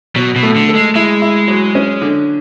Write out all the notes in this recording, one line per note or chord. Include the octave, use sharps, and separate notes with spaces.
B2 F#3
B2
A3
D3
A4
G#3
G#3 E4
E4
F#3
C#4
D3